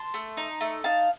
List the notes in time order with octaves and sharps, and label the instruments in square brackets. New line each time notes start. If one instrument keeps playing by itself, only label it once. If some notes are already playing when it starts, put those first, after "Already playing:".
Already playing: [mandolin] A5 C6
A3
D#4
A3
D#4 F5 A5